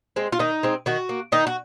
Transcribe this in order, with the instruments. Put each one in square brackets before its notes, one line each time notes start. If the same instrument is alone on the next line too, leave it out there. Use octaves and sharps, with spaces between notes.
[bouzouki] G#3 C4
F4
D#3 D#4
G#3 C4
D#3 F#4
A#3
D#3 D#4
F#4